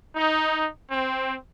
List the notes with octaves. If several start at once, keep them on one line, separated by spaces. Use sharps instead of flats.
D#4
C4